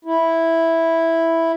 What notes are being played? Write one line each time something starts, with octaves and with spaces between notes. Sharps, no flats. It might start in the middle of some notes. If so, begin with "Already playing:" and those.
E4